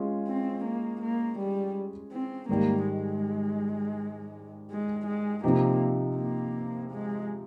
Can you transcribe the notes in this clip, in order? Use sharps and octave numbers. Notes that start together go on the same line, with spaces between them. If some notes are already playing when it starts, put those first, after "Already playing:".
Already playing: G#3 C#4 F4 G#4
C4
A#3
A#3
G3
C4
G#2 D#3 G3 A#3
G#3
G#3
G#3
C3 F3 A#3 C4 D#4 G4
A#3
G#3